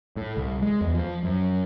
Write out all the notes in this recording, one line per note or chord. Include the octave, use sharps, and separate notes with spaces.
A2
C2
G#3
E2
F3
F#2